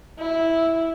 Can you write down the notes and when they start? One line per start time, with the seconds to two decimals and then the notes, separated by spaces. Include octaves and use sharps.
0.19 E4